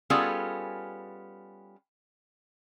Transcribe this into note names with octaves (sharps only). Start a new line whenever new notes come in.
G3 B3 C#4 F4 G#4 A4